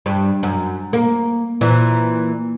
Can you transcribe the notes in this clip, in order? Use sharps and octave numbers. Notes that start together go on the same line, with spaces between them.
G2
F#2
A#3
A#2 E3